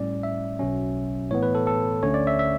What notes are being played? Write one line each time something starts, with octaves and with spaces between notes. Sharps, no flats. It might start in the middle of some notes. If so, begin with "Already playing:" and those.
Already playing: A2 G3 C#4 D5
E5
B1 B2 F#3 C#4
A2 E3 B3 C#5
B4
A4
A4
D2 D3 A3 C#4 C#5
D5
E5
E5